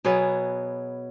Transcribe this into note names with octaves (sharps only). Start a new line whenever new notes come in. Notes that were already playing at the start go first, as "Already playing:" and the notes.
B2 F#3 B3 G#4